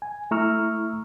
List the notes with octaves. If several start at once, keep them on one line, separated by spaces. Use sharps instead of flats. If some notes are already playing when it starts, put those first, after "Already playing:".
G#5
A3 E4 A#5 C#6 E6 F6